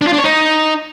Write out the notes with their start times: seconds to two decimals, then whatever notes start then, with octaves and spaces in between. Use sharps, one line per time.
0.01 D4
0.07 F4
0.13 D4
0.18 C#5
0.24 D#4